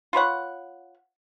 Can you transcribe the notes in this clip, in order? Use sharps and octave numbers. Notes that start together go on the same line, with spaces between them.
F4 B4 C#5 F#5